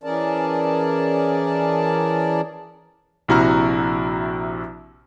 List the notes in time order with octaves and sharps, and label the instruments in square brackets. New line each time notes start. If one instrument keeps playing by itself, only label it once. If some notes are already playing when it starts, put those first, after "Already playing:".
[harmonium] E3 C#4 G#4 A#4 D5 A5
[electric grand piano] A#1 C3 E4 F#4 A#5 F6